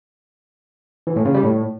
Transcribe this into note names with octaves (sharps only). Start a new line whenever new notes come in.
E3
A2
C#3
G3
A2